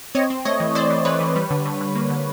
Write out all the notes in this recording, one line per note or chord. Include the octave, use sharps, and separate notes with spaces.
C4 C#5 D#5
C4
A3 C#5 D#5
E3
E3 C5 D5
E3
E3 B4 C#5
E3
G3
D3
D3
D3
A#3
D3